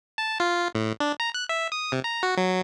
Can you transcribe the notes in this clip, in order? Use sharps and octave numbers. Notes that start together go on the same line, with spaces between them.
A5
F4
A2
D4
A#5
F#6
E5
D#6
C3
A#5
F#4
F#3